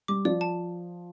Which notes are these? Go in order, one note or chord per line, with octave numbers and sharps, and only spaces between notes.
G3 D6
F3 D5
A5